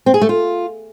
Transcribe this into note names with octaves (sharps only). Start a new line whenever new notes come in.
C4
G#4
A3
F4